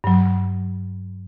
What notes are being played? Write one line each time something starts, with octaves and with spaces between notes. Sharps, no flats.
G2 F#3